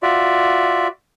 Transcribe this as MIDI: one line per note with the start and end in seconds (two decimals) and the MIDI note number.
0.03 0.88 65
0.03 0.88 66
0.03 0.88 74
0.03 0.88 76